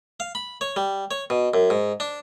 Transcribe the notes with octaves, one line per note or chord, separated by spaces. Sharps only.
F5
B5
C#5
G3
C#5
B2
F#2
G#2
D4